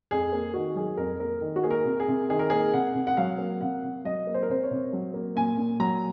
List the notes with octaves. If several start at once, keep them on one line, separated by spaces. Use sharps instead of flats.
F2 G#4
A#3
D#3 F#4
F#3 G#4
F2 A#4
A#3 A#4
D#3
F#4
A#3 G#4
A#4
C3
G#4
C3
D#3 G#4
A#4
A#3 G#4
C3 F#5
C3
F#5
F#3 F5
A#3
C3 F#5
C3
F#3 D#5
A#3
C5
A#4
C3 C5
C#5
C3
F#3
A#3
A#2 G#5
A#2
F#3 A#5